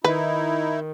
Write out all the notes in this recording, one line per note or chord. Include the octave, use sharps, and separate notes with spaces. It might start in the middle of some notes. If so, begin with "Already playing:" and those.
D#3 D#4 E4 B4